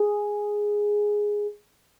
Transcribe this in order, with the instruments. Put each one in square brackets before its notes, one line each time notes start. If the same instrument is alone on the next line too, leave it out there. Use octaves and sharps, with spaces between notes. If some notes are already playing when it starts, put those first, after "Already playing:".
Already playing: [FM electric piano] G#4